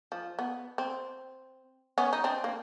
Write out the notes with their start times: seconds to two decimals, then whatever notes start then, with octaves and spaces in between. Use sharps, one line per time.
0.12 F3
0.39 B3
0.78 C4
1.98 B3 C#4
2.13 D#4
2.24 C4 D4
2.44 A#3